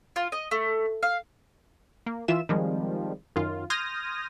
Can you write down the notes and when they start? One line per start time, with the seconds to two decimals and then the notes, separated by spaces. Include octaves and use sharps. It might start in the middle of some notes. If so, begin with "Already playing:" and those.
0.16 F4
0.32 D#5
0.51 A3
1.03 F5
2.06 A#3
2.28 E3 F4 E5 E7
2.49 D#3 F3 G3 G#3 C4
3.36 F#2 D#3 F4
3.70 C6 D#6 F6 G6 G#6 A#6